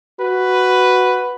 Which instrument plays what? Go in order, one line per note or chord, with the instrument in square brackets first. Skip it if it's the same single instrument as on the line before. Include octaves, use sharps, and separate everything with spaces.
[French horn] F#4 [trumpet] B4